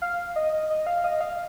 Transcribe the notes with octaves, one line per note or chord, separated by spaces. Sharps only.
F5
D#5
D#5
D#5
F5
D#5
F5